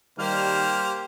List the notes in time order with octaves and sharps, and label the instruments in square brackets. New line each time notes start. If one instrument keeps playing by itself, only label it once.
[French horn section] D#3 G3 [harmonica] A#3 C5 [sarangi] G4 [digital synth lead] F6